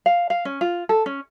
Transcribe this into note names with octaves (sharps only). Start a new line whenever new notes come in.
F5
F5
C#4
F4
A4
C#4